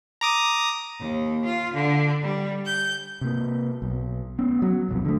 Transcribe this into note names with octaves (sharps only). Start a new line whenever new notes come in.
A#5 D6 D#6
D#2
F4
D3
G3
G6
C3 A#3
B1
B3 C#4
F#3
D#1 B1 F2
D3 A3